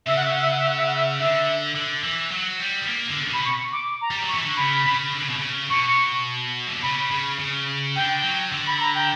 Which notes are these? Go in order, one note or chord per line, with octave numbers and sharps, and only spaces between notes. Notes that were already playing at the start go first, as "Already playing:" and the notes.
C#3 E5
F#5
E5
F#5
E5
F#5
E5
F#5
E5
F#5
E5
D3 E5
D3
E3
F#3
G3
B3
A#3
D3
C#3
B2
B5
C#6
D6
A#5
G3
F#3
C#6
E3
D3
C#3 B5
C#3
D3
C#3
B2
C#3
B2 C#6
E3
D3
C#3 B5
C#3
C#3
D3 G5
F#3
D3
B5
A#5
G5